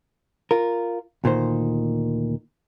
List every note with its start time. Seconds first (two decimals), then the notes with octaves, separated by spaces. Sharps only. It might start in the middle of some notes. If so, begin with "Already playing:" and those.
0.51 F4 A#4
1.24 D2 A#2 D#3 C5